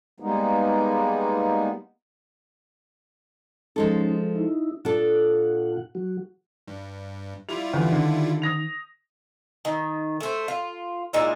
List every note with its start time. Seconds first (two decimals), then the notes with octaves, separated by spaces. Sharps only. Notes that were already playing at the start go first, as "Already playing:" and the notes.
0.20 G3 G#3 A#3 B3 D#4
3.76 F3 G#3 C#4 D#4 A4
4.35 D#4 E4
4.85 A#2 D4 F4 A4 F#5
5.95 F#3 F#4
6.68 G2
7.49 G3 E4 F4 F7
7.74 E2 D3
7.92 D3 D#3
8.42 D#6 A#6 F7
9.65 D#3
10.20 A3 C5
10.48 F4
11.13 A#2 G#3 D#4 E4